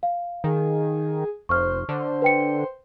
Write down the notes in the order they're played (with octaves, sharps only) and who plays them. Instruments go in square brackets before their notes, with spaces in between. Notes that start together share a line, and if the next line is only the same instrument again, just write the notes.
[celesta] F5
[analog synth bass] D#3 [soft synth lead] G#4
[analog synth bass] F1 [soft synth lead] C5 [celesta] C#6 F6
[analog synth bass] D3 [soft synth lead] C5
[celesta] B4 G5 C#7